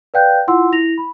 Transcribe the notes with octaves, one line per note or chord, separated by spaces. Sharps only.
B4 D5 F5 G5 F#6 G6
E4 F4 F#5 C6 E6
E4 A#6 F7
B5